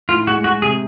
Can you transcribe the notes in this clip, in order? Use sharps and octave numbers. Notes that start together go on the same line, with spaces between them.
A2 F4
G#3 F#4
G#3 F#4
C3 G#4